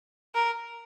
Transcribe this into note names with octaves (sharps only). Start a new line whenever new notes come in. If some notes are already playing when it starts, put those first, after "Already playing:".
A#4